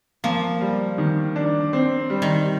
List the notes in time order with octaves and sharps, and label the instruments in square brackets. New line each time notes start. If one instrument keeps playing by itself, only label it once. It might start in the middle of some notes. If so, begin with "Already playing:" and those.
[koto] F3 [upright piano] A#3
[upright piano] G3
D#3
D4
C4
G3
[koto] D#3